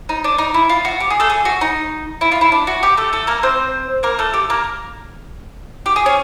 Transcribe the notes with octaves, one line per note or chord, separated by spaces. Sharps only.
D#4
D4
D#4
E4
F4
F#4
G4
G#4
A3 A4
G#4
F#4
D#4
E4
F4
E4
D4
F#4
G4
A3 A4
A3 A4
A#3 A#4
C4 C5
A#3 A#4
A3 A4
G4
A#3 A#4
G4
G#4
C#4 C#5